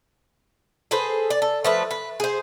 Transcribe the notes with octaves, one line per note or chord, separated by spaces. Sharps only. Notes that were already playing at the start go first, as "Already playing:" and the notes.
G#4 A4 B4 C5
D5
A4
F3 A3 B4
B4
G#4 C5